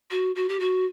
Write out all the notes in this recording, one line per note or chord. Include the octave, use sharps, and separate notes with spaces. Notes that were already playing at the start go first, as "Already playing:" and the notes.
F#4
F#4
G4
F#4